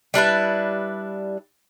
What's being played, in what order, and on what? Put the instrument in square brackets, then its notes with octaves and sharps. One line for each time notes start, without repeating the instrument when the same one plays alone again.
[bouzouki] G3 D4 E4 B4